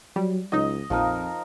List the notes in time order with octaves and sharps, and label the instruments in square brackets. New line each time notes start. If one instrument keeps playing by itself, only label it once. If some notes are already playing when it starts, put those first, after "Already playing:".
[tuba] F#3 [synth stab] G3
[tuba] C#2 [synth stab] F#3 D#4 [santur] D#5
[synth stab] A#1 [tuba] F2 [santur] F3 D#4 A#4